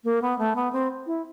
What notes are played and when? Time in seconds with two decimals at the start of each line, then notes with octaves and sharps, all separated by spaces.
0.04 A#3
0.22 B3
0.39 A3
0.56 B3
0.73 C4
1.06 E4